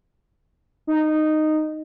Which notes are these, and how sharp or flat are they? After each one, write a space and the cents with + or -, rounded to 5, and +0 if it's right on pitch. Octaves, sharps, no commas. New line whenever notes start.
D#4 -10